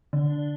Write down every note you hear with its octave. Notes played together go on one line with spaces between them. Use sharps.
D3